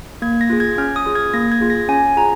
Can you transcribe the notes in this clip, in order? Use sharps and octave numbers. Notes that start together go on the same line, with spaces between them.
A#3 G#6
A#6
F4 G#4
G#6
C#4 F6
D#6
F4 G#4
G#6
A#3 A#6
G#6
F4 G#4
A#6
C#4 G#5
F4 G#4 A#5